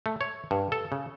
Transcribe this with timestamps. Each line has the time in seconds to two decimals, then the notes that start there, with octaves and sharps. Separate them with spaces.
0.06 A3
0.21 C#5
0.51 G2
0.72 A4
0.92 C#3